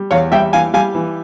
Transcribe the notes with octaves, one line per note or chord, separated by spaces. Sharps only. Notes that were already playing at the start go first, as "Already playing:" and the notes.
Already playing: G3
E2 C#5 F5
G3 E5 G5
E3 F5 G#5
G3 F5 G#5
E3